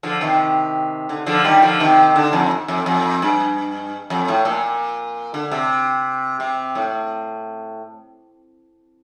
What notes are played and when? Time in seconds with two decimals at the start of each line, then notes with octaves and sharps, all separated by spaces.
0.03 D3 F3
0.21 C3 D#3
1.09 D3
1.26 D3 F3
1.44 D#3 G3
1.62 D3 F3
1.80 C3 D#3
2.16 D3
2.33 F2
2.68 F2
2.86 F2
3.22 G2
4.10 F2
4.28 A2
4.45 A#2
5.34 D3
5.52 C3
6.40 C3
6.75 A2